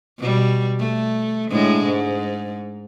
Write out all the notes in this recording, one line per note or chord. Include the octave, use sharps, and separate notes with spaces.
B2 G3
A3
A2 D3 G#3
G#2